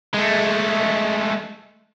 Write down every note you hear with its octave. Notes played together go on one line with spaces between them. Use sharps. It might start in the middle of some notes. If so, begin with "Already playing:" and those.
G#3 A3